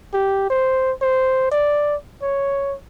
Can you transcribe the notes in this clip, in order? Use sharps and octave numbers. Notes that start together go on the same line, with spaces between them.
G4
C5
C5
D5
C#5